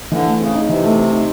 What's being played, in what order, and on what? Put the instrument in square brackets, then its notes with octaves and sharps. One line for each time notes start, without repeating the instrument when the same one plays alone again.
[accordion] D3 [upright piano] E3
[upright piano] A3
[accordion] C#3 [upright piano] C4
[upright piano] D#4
[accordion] C3 [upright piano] E3
[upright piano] A3
C4
D#4